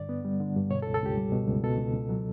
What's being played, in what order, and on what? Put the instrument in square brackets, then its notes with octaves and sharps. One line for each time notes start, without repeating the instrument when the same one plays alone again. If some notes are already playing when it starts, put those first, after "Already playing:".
Already playing: [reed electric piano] G2 D3 D5
B3
G3
D3
G2
B2 C#5
A4
C#2
A4
C#2 G4
G3
B2
C#2
B2 A4
C#2
C#2
F#3